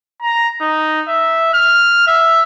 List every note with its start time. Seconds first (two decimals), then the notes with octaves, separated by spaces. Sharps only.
0.22 A#5
0.61 D#4
1.08 E5
1.54 F6
2.07 E5